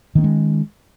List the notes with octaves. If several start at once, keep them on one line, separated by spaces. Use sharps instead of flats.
D#3 G#3 A#3 C#4